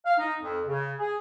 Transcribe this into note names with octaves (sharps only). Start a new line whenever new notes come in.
F5
D#4
F2
C#3
G#4